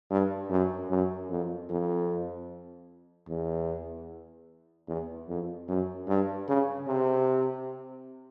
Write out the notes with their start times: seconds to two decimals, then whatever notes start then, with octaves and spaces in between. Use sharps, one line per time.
0.11 G2
0.50 F#2
0.90 F#2
1.30 F2
1.70 F2
3.29 E2
4.88 E2
5.28 F2
5.68 F#2
6.08 G2
6.49 C#3
6.88 C3